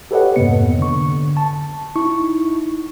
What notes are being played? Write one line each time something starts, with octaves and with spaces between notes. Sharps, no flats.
G4 A4 B4 C#5 D#5 F#5
F2 G#2 C3 A#3 B3 C#7
D3 C#6
A5
D#4 E4 C#6